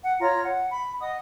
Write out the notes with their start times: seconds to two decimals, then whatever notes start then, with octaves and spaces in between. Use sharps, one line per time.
0.02 F#5
0.20 F4 C#5 A#5
0.44 F#5
0.70 B5
1.00 D#5 F#5 D#6